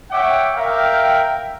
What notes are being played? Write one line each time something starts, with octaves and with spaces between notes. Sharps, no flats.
C#5 E5 F#5 G5 D6
A#4 E5 F5 G5